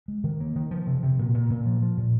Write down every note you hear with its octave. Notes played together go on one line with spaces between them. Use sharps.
G#3
D#3
A#3
D#3
F3
C3
C3
A#2
A#2
A#2
F3
F3
A#2